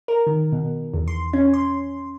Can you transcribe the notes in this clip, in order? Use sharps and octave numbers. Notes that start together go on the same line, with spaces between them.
A#4
D#3
B2
E2
C6
C#4
C6